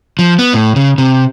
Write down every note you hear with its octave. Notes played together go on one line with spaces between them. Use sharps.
F3
B3
A2
C#3
C3